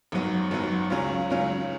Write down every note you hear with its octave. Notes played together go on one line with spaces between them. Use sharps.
G#1 F#2 F#3 B3
G#1 F#2 F#3 B3
C#2 C#3 F#3 C#4
C#2 C#3 F#3 C#4